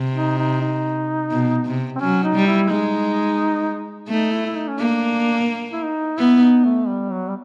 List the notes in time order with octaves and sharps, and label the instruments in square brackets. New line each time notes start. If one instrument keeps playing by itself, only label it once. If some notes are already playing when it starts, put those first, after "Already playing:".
Already playing: [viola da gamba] C3
[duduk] D#4
D#4
D#4
[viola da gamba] B2
C3
[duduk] C4
[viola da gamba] F#3 [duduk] C#4
[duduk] D#4
[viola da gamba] G3
[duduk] E4
[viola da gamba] G#3 [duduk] D#4
[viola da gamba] A3 [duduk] D#4
[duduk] E4
E4
D#4
C#4
[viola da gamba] A#3 [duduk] D4
[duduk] E4
D#4
[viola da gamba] B3 [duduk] E4
[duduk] D#4
A3
G3
F#3
G3